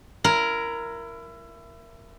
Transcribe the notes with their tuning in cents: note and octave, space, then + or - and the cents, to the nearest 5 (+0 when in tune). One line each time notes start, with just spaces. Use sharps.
E4 +25 A#4 +0